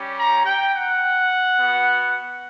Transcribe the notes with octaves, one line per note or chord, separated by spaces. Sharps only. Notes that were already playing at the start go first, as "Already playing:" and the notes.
Already playing: G3 C#4 G4
A#5
G5
F#5
B3 F#4